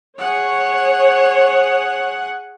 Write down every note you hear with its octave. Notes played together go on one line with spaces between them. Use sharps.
G#4 C#5 F#5